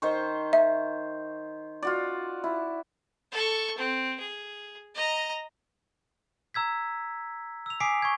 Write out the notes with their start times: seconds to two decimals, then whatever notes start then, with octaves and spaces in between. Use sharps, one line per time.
0.02 D#3 C5 C#6
0.53 E5
1.83 F4 F#4 D5
2.44 E4
3.32 A4 C#6
3.78 C4
4.20 G#4
4.95 D#5 A#5
6.54 A#5 E6 G#6 B6
7.66 E6 F7
7.80 G#5 D6 D#6 B6 C7 D7
8.02 C#6 G#6